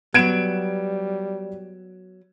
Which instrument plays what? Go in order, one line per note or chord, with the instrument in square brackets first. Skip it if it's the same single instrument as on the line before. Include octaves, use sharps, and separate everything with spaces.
[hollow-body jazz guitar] F#3 B3 [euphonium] G3 [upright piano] G#6 D7 E7